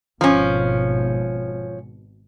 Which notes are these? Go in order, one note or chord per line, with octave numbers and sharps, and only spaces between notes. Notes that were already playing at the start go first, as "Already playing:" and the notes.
G#1 B2 F3 C#4